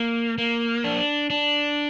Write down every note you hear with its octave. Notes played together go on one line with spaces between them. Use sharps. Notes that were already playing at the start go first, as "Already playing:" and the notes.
Already playing: A#3
A#3
D4
D4